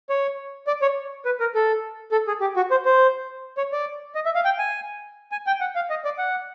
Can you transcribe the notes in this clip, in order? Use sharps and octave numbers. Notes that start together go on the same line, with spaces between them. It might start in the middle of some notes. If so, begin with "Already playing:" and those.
C#5
D5
C#5
B4
A#4
A4
A4
G#4
G4
F#4
C5
C5
C#5
D5
D#5
E5
F5
G5
G#5
G#5
G5
F#5
F5
D#5
D5
F#5